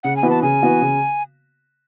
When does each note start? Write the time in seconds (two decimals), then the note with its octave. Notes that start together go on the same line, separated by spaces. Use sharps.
0.03 C#3 F#5
0.16 G#5
0.22 E3 B3 F#4 B4
0.30 A5
0.42 C#3 G#5
0.62 E3 B3 F#4 B4
0.81 C#3